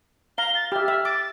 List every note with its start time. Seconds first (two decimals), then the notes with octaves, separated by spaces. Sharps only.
0.38 F5 A#5 G7
0.55 A6
0.72 G4 E5 F6
0.88 E5
1.05 D6 A6